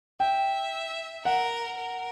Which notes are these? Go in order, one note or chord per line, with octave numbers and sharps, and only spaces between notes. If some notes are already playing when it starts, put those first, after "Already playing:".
E5 G5
A#4 F#5
A#4